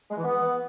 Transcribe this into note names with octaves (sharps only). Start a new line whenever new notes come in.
G#3
E3
B3